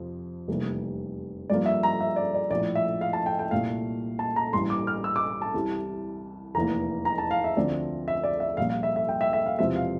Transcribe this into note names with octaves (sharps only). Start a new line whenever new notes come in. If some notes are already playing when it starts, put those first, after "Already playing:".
Already playing: F2 C3 F3
F1 E2 C3 G3 A#3
G2 F3 A#3 D5
E5
A#5
E5
D5
D5
A#1 A2 F3 D5
E5
F5
A5
G5
G5
C2 A#2 A3 F5
A5
A#5
A1 G2 E3 A#3 C6
D6
F6
E6
D6
A5
C2 C3 E3 G3
F1 E2 E3 A#3 A#5
A#5
A5
F5
E5
D2 D3 F3 A3 C4 D5
E5
D5
E5
A#1 A#2 G3 A#3 F5
F5
E5
E5
G5
E5
E5
F5
E1 E2 C3 F3 C4 E5
F5